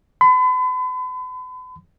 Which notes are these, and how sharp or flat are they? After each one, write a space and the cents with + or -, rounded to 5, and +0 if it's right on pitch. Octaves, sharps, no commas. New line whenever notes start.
B5 +40